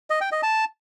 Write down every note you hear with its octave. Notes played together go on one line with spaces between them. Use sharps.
D#5
G5
D#5
A5